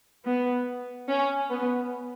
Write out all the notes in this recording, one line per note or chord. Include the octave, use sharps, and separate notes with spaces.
B3
C#4
B3